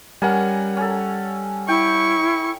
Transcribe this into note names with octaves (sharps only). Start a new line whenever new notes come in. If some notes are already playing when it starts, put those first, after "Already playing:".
G3 C#4 A#4 F#5 G#5
C#4 A4
E4 G5 C#6